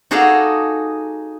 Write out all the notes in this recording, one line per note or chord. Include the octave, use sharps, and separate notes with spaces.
D#4 F#4 G#4 A4 D5 F5